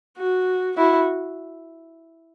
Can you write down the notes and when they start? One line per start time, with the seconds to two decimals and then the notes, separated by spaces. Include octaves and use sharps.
0.17 F#4
0.76 E4 F#4